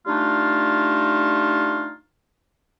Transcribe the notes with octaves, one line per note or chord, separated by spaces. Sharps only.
G3 A3 D4 D#4 F4